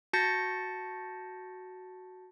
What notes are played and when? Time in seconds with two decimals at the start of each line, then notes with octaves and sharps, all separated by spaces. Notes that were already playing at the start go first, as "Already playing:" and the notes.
0.13 F#4 A5 G6 A6 A#6 C#7